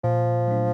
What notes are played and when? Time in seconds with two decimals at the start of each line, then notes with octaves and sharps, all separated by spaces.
0.04 A#2 F3
0.48 F#3 A3 D4